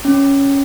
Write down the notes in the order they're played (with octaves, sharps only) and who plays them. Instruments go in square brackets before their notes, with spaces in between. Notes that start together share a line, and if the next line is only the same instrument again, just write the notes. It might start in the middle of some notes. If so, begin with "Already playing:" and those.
[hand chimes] C#4